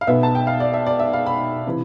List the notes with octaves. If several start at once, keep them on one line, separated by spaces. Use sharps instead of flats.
F5
B1 B2 B3 E5
A5
G5
F5
D5
E5
D5
E5
F5
B5
C3 E3